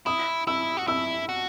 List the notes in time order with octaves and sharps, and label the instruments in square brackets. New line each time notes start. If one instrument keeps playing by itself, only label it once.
[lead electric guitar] E4 [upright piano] D#6
[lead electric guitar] E4 [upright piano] E6
[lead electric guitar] F#4
[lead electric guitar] E4 [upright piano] E6
[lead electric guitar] F#4